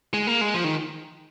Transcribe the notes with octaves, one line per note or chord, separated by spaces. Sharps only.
G#3
A#3
G#3
F3
D#3